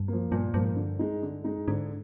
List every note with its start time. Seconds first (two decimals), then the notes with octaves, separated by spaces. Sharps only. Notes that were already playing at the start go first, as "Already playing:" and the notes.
Already playing: G2
0.08 F3 A#3
0.32 G2 A#2
0.54 G2 F3 A#3
0.63 G#2
0.71 G2
0.76 D3
0.99 G#3 D#4
1.23 D3
1.44 G#3 D#4
1.68 G#2 D3